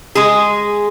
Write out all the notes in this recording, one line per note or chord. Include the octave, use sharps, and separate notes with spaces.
G#3 G#4